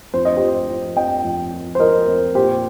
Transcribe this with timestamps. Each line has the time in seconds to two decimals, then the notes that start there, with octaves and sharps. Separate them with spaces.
0.13 F2 C5
0.25 D#5
0.37 F3 G4 C5
0.69 F3
0.96 F2 D#5 G5
1.24 F2
1.52 F3
1.75 C5
1.79 F3 A#4 D#5
2.08 F2
2.35 A#2 G4 C5